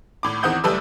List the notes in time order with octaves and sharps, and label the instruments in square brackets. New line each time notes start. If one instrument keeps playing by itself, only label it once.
[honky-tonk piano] G#1 A2 D6
E2 D#3 C4 F#5 D#6 G6
F#1 G3 A3 A4 B4 E6